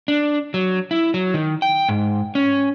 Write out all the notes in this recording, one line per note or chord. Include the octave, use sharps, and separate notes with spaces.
D4
F#3
E4
F#3
D#3
G5
G#2
C#4